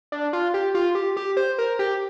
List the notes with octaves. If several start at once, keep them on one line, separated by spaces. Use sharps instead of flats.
D4
F4
G4
F4
G4
G4
C5
A#4
G4